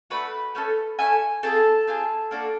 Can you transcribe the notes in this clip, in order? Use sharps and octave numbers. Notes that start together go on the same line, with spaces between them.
A3 D4 F#4 B4 B5
A3 C#4 E4 A4
A3 C#4 E4 A4 G#5
C4 F4 G#4 A4 A5
C4 F4 G#4
A#3 D4 F#4 A4